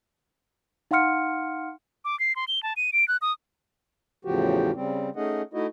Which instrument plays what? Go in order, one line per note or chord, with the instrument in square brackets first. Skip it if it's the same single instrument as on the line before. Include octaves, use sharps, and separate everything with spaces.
[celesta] D#4 F5 F#5 C6 F6 C#7
[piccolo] D6
C7
C6
G7
A5
D#7
D7
F#6
D#6
[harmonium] E2 A2 C#3 F3 F#4 G4
C#3 G3 C4
A3 C#4 D#4 G#4 D#5 F#5
A3 D#4 E4 F#4 D#5